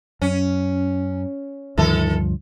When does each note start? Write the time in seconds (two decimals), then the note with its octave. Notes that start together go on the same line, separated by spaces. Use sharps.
0.22 F#2 C#4
1.78 D2 G2 D#3 F3 A4